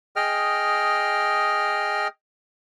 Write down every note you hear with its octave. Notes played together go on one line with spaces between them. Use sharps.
G#4 D#5 G5 F6